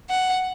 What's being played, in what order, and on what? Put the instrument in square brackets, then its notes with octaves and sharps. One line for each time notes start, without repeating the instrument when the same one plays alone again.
[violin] F#5